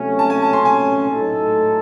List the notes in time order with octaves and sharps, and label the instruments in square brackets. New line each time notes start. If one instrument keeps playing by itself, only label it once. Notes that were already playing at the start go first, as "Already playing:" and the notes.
Already playing: [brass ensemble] C3 F#3 A3 C#4
[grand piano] A5
G#5
A5
C6
G#5
[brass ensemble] A2 F#3 A3 D#4 A4